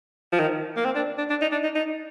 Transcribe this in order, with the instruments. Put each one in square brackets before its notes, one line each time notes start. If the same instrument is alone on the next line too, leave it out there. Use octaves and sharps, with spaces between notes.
[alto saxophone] F3
D#3
A#3
C4
D4
D4
D4
D#4
D4
D#4
D#4